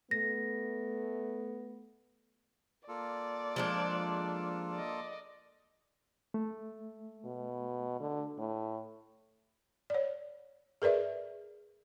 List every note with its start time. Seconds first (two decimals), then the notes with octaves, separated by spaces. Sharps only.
0.11 A3 B3 A#6
2.88 A#3 F4 A4 D5
3.56 F3 G#3 D4
4.71 D5 D#5
6.34 A3
7.25 B2
8.00 D3
8.38 A2
9.90 C#5 D5
10.82 G#4 A#4 B4 D5 E5